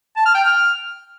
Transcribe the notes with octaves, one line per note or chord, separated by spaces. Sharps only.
A5
F6
G5
F6